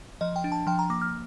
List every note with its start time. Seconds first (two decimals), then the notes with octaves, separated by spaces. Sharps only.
0.21 F3 D#5
0.36 G5
0.44 D4
0.52 A5
0.67 F3 G5
0.79 A#5
0.90 A#3 D6
1.02 F6